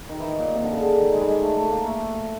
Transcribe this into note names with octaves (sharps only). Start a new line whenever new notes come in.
D#3
D#3 E3
A#2
C3
D3
C#3
D3
D#3
G#3
G3
G#3
A3
A3
A#3
A3